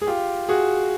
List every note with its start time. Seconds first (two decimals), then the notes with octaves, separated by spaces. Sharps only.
0.02 G#4
0.07 F4 G4
0.49 F#4 G#4